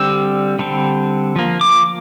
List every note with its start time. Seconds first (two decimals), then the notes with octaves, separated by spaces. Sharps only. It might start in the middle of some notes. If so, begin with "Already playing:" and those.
Already playing: D3 G3 C4 E6
0.59 D3 G3 C4
1.36 F3 A#3
1.61 D6